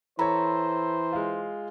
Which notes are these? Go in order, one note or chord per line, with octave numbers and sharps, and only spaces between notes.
E3 A4 C5 C#5 A#5 B5
G#3 F4